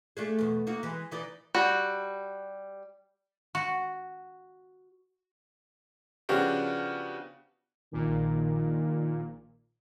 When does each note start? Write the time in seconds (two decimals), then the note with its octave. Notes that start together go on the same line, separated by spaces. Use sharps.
0.17 A3 D4 G#4
0.39 E2 B2
0.67 A#3 D#4 F#4
0.83 E3 G#3
1.12 E3 D#4 D5
1.55 G3 F#4
3.55 F#4
6.29 C#3 F3 B3 D4 F#4 G4
7.93 A#1 A#2 D#3